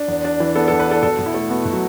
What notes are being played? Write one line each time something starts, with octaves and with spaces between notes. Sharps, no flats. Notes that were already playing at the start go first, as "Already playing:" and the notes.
Already playing: D4
E2
D4
E3
B3 A4
E2 A4
B4
D4 A4
B2 A4
B2
E4
A3
B3 F#4
B2
F#3